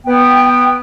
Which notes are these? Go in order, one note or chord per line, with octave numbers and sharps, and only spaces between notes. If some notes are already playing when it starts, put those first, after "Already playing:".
B3 G5